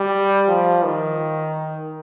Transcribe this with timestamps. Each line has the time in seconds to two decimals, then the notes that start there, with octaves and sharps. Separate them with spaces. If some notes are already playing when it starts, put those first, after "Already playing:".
Already playing: G3
0.48 F3
0.84 D#3